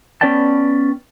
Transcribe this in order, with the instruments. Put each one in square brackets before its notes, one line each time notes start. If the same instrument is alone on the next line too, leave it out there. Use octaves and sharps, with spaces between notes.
[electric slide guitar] B3 C#4 B4 D5 G5 A5